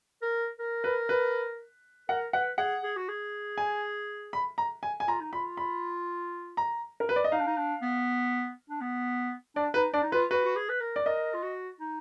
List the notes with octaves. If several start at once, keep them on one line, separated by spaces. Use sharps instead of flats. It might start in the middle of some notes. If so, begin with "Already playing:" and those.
A#4
A#4
B4
B4
A#4 F#5
B4 F#5
G#4 F#5
G#4
F#4
G#4
G#5
B5
A#5
G#5
G#5
F4 A#5
D#4
F4 B5
B5
A#5
A#4
B4
D5
D#5
D#4 F5
D4
D#4
D4
B3
D4
B3
D4 D5
D#4 B4
D4 D5
D#4
F4 B4
F#4 B4
F#4
G#4
B4
A#4
D5
A#4 D#5
F4
F#4
D#4